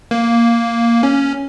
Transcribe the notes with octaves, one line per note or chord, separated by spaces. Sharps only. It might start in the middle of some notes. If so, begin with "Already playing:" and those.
A#3
C#4